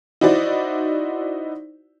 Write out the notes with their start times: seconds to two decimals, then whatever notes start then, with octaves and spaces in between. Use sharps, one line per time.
0.21 D#4 E4 F#4 C5 D5